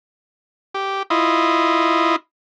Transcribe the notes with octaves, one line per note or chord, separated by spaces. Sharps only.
G4
E4 F4 D#5